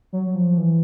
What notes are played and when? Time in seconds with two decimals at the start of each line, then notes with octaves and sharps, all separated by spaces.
0.13 F#3
0.27 F#3
0.35 F3
0.58 E3